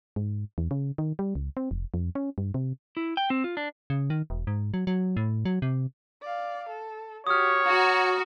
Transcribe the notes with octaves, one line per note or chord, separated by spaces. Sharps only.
G#2
E2
C#3
D#3
G3
C#2
C4
F1
F2
C#4
G2
C3
E4
G5
C4
F4
D4
C#3
D#3
E1
G#2
F#3
F#3
A2
F#3
C3
D5 F5
A4
F#4 G4 C#5 D#6 F6
F#4 A#5